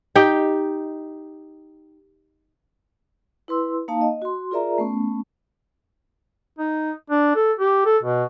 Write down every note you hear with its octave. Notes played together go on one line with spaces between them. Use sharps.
D#4 G4 G5
E4 B4 C6 E6
A#3 D#4 F5 A5
D#5
F#4 C6
F4 G#4 A#4 D5 E5 A#5
A3 B3 C#4
D#4
D4
A4
G4
A4
B2